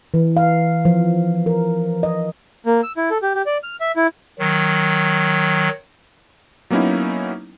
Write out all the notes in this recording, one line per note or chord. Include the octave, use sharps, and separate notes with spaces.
E3
F5
F3
A#4
D#5
A#3
E6
E4
A4
G4
G4
D5
F6
E5
E4
D#3 F#3
F#3 A#3 B3 C#4 D#4 E4